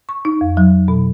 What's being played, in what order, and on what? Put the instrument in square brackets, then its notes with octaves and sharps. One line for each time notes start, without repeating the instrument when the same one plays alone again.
[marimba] C#6
D#4
F2
F#3
B2